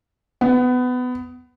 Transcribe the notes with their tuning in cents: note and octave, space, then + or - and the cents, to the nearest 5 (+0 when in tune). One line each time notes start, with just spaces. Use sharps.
B3 +20